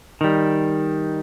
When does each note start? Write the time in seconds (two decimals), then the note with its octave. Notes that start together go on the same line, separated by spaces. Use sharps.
0.21 D#3 G3